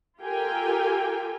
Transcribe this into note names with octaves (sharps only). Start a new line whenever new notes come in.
F4 G4 A4 A#4 G5 G#5